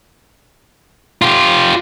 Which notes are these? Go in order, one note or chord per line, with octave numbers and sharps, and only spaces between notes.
F4 G4